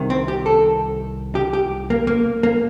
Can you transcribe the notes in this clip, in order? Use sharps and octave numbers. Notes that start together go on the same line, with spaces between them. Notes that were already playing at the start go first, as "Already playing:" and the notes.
Already playing: C2 C3 D#3
C4
G4
A4
G4
G4
A#3
A#3
A#3